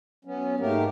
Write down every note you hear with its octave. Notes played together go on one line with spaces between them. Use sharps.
F#3 B3 C#4
G#2 A3 A#3 G4 A#4